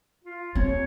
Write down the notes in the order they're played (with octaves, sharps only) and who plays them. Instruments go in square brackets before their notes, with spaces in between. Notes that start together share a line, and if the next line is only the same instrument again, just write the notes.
[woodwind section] F4
[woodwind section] D#2 C#5 [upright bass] C4